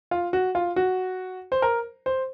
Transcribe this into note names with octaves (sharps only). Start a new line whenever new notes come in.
F4
F#4
F4
F#4
C5
A#4
C5